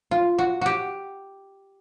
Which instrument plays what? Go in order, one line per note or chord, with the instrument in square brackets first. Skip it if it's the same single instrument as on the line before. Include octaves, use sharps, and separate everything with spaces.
[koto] F4
F#4
F#4 G4